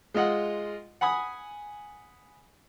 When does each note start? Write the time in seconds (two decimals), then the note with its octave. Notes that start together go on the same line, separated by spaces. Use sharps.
0.14 G#3 F4 D#5 F#5
1.01 F#5 G#5 B5 D#6